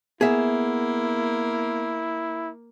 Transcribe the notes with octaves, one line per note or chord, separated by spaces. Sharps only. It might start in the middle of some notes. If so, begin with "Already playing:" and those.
A#3 B3 E4 G#4 E5